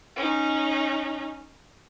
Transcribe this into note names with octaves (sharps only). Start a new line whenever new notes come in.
C#4 D#4